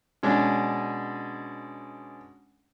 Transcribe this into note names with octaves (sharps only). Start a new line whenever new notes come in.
B2 G#3 C#4 D4